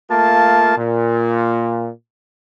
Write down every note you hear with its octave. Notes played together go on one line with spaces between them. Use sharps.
A3 A#3 F4 A5
A#2